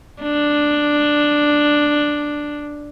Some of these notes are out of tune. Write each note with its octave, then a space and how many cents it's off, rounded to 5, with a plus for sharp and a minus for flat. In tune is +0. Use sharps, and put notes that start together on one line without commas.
D4 +5